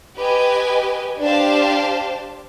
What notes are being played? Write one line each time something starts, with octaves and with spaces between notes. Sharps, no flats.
G4 B4 D#5 G#5
D4 G4 C5 F5 A5